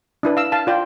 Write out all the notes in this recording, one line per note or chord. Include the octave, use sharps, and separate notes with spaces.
D4 E4 B4
F5 E6
F5 A5
F4 D5 G5